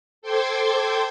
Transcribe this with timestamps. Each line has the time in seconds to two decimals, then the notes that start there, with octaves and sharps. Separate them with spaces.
0.22 A4 C5 G5 C6 D6 G#6